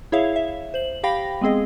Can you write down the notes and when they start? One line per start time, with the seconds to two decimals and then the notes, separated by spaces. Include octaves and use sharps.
0.12 E4 G#4 C#5 E5 F5
0.36 E5
0.74 C5 F#7
1.03 G4 F5 G5 B5 A#6
1.41 G#3 B3 C4 G#4 D#5